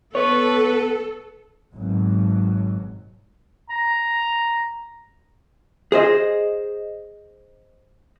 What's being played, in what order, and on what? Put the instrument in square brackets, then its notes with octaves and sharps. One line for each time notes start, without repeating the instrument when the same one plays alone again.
[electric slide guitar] B3 [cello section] A4 [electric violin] B4 [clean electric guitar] C#5
[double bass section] G#1 B2 F#3
[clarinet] A#5
[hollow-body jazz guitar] G#4 C5 D#5